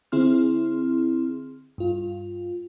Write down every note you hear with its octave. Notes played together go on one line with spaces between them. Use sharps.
D3 C4 E4 G#4 C6 F6
G2 F4